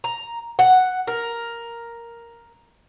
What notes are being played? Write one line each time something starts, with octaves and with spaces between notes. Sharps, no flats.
A#5
F#5
A#4